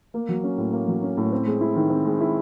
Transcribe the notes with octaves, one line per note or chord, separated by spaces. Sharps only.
A#3
F#3
C#4
A2
A#3
F#3
C#4
A2
C4
G#3
E4
D#3
C4
G#3
E4